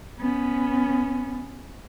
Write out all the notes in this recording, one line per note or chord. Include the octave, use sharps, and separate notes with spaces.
B3 C#4